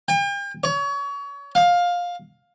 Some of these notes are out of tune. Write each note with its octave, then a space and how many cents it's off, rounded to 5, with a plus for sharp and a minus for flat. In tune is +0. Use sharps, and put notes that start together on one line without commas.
G5 +40
C#5 +30
F5 +15